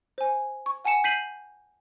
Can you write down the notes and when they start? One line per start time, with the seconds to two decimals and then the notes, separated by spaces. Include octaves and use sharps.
0.18 C5 G#5
0.66 C#6
0.85 F#5 G#5 A5 C#7 E7
1.04 G6 B6 C7 D#7 F#7